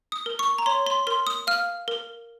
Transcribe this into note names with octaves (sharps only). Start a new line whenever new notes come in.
D#6
A#4
C#6
A#5
C#5 C6
C6
A#4 C6
D#6
F5 F6
A#4